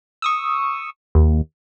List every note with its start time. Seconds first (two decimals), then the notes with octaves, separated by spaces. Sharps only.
0.22 C#6 D#6 E6
1.15 D#2